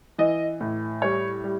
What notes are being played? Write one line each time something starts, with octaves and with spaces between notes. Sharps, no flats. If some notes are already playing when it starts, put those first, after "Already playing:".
E3 D#5
A2
G3 C#5
G3